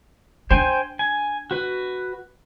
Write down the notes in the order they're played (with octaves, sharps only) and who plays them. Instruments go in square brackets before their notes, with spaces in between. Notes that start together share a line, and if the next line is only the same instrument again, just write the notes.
[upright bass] D4 [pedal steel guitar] C5 G5 G#5
[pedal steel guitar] G#5
F#4 B4